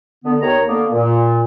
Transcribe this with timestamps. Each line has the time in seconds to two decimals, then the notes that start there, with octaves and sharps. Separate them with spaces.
0.24 D3 B3
0.41 D#2 D#3 C#5 A#5
0.66 D3 A#3 B3
0.91 A#2